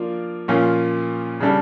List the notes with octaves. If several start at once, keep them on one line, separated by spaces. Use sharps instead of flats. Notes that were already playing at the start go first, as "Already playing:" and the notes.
Already playing: F3 A#3 D4 F4
A#2 F3 A#3 C#4 F4
C#3 G3 D4 A4